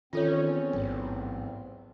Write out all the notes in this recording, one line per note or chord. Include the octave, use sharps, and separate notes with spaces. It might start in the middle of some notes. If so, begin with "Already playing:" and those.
E2 D#3 C4 C#4 F4 A4 C#5
A1 G#2 F#3